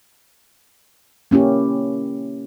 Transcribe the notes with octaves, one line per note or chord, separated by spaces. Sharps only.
A#3 C#4 E4 G4